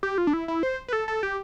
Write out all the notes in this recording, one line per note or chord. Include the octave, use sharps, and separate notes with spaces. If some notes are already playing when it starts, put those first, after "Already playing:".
G4
F4
D4
E4
E4
C5
B4
A4
A4
G4